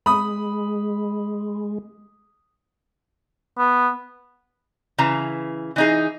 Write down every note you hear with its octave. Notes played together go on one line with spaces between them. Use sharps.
G#3 B5 D#6
B3
C#3 E3 A#5
E3 D#4 G#4